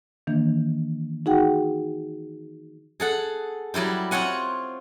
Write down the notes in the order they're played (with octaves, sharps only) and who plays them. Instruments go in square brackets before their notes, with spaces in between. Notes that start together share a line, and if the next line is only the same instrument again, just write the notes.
[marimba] D#3 E3 A#3 D4
D#4 F#4 G#4 F#5 G5
[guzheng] G#4 A4 F#5
F#3 G3 E4 G4
C4 F4 C#5 F#5 G#5